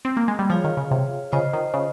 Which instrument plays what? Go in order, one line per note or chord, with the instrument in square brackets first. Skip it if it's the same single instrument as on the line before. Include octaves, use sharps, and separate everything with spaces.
[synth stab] C4
A#3
G#3
G3
[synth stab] F3 [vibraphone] F4 G#4 C#5 F5
[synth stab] D#3
C#3
C3
[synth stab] C#3 [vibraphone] F4 C5 D#5
[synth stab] D#3
C#3